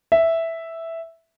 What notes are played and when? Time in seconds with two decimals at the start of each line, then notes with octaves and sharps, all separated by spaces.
0.12 E5